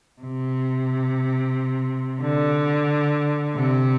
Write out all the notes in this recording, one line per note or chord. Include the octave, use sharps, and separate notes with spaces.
C3
D3
C3